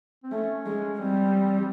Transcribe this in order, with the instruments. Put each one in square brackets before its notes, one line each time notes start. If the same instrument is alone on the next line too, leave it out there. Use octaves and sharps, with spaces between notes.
[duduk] C4
[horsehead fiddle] A3 [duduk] C#4
[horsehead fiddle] G#3
[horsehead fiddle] G3 [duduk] C4